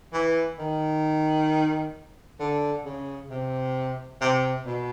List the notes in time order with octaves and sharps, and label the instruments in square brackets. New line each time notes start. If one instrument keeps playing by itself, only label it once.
[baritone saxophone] E3
D#3
D3
C#3
C3
C3
B2